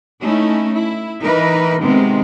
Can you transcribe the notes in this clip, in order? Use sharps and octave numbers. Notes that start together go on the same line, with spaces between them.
A3 C#4 D#4 E4
E4
E3 D#4 A#4 B4
C3 D#3 G#3 B3 C4